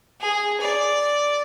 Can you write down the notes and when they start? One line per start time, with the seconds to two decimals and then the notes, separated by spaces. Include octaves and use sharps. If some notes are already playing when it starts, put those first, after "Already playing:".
0.21 G#4
0.60 D5